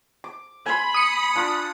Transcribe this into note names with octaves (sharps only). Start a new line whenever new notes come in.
D6
G#5 B5 C6
D#6 C#7
D4 F4 D6